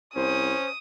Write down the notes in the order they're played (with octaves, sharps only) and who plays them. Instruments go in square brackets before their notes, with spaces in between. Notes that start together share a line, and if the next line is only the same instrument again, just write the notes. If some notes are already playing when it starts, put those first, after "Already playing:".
[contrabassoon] C2 [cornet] C#4 [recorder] C5 [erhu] D#6